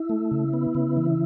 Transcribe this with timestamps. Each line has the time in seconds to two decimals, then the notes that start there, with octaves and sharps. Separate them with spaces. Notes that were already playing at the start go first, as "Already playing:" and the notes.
Already playing: E4
0.09 A3
0.31 C#3
0.53 B3
0.75 C#3
0.97 E3